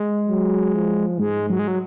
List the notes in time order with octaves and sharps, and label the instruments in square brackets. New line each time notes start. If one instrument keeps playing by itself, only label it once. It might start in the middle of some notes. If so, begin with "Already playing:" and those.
Already playing: [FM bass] G#3
[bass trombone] F#3
F3
[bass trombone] G#2 [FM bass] G#3
[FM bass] F#3
G#3
F#3